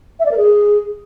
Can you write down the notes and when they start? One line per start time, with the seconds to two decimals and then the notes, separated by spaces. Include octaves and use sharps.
0.20 E5
0.26 D5
0.31 A#4
0.37 G#4